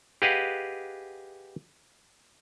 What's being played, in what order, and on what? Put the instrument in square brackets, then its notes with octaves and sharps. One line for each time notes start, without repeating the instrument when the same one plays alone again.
[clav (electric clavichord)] G4 G#4 B4 D#5 F5 F#5